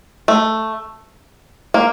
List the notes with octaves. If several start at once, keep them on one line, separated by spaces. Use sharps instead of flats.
A3
A#3